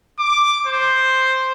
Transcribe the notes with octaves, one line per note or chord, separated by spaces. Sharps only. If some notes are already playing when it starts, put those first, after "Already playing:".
D6
C5